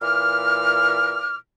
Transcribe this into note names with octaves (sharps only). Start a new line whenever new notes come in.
A#2 E3 D6 F6